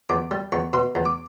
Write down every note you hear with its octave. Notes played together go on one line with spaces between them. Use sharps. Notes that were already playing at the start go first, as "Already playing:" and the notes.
E2 D6
G3
E2 C#6
B2 C6
E2
D6